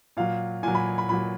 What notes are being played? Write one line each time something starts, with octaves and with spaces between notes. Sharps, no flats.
A#2 F#3 F5
A#2 F#3 G#5
B5
B5
A#2 F#3 B5